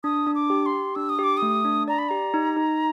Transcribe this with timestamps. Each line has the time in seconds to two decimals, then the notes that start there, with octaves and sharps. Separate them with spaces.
0.04 D4 D#6
0.27 D4
0.35 D6
0.50 G4
0.66 C6
0.73 G4
0.95 D4 E6
1.09 D#6
1.19 G4 D6
1.37 D#6
1.42 A3
1.65 D4
1.88 D5 A#5
1.98 B5
2.08 G4 A#5
2.34 D#4
2.56 D#4